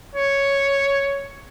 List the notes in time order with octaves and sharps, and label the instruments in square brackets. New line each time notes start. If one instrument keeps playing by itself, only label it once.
[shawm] C#5